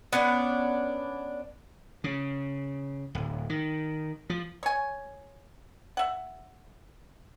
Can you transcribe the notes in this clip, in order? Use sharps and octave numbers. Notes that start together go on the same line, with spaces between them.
B3 C#4 D4
C#3
D1
D#3
F3
C#5 G#5
E5 F#5